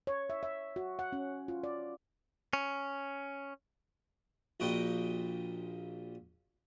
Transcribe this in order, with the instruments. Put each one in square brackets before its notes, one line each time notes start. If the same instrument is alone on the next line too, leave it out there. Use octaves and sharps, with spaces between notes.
[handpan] C#5
E5
E5
F#4
F#5
C#4
F4
D5
[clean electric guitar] C#4
[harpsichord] A#1 A#2 F#4 D#5 G5 B5